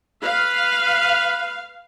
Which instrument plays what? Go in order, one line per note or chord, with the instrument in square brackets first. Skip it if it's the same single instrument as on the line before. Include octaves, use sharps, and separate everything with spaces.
[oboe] B4 [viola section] F5